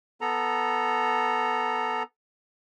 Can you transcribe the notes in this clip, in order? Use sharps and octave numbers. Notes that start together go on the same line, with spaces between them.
B3 A4 A#5